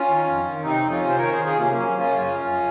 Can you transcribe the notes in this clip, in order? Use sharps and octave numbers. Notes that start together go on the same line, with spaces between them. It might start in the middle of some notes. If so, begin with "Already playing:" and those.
Already playing: C#4 F4
D#3
F2
D#3
C3 C4 D#4
F2
C#4 F4
C3
C5
D#3 A#4 C#5
D#3 G#4 C5
F4 G#4
C3 A#3 C#4
F#2 A#3 C#4
F#2
C#4 F4
C#3
F#2
F#2